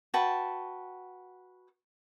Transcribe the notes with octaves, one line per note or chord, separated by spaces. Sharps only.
F#4 B4 G5 A5